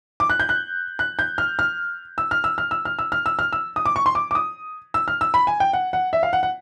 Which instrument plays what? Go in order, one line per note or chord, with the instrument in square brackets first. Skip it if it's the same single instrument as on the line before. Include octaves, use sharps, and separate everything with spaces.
[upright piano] D6
F#6
G6
F#6
F#6
G6
F6
F6
E6
F6
E6
F6
E6
F6
E6
F6
E6
F6
E6
D#6
D6
C#6
C6
D6
D6
D#6
E6
F6
E6
B5
G#5
G5
F#5
F#5
E5
F5
F#5
F#5